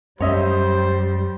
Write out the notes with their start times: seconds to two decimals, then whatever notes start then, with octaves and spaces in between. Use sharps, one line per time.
0.21 F#2 G3 C#4 C5 C#5 D#5 E5